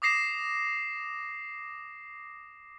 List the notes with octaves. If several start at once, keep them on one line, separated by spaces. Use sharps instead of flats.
D6 D#6 A#6 C7 E7